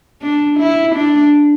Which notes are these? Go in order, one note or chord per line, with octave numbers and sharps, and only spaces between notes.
D4
E4
D4